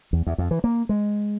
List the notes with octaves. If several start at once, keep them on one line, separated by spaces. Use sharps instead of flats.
E2
E2
F2
E3
A#3
G#3